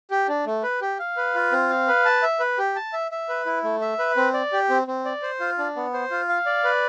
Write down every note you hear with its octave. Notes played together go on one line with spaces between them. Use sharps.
G4
D4
A3
B4
G4
F5
B4
F4
C4
F5
B4
A5
E5
B4
G4
A5
E5
E5
B4
E4
A3
E5
B4
C4
D5
G4
C4
C4
D5
C5
F4
D4
B3
C5
F4
F5
D5
B4